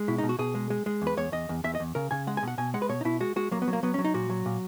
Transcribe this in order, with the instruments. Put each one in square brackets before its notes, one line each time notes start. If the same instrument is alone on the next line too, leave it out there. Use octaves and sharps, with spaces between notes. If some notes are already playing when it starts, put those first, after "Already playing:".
Already playing: [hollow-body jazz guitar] G#3
B2 E4
D#4
B2
F#4
B2 G#4
G#3
G#3
G#3
E2
B4
E2 C#5
E2 D#5
E2
E2 E5
D#5
E2
C#3 A#4
C#3 G#5
G#3 F#5
G#5
B2 F#5
B2 G#5
G#3 F#5
B4
B2 C#5
D#4
B2 E4
G#3 F#4
G#3 F#4
F#3 A#3
B3
F#3
A#3
F#3 B3
C#4
F#3
D#4
A#2 F#4
F#3
A#2